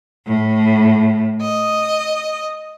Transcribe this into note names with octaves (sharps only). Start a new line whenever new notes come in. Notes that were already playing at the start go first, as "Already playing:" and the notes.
A2
D#5